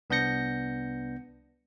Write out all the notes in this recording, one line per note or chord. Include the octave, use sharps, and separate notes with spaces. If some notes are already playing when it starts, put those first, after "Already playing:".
C2 B3 D4 G6 A#6 C#7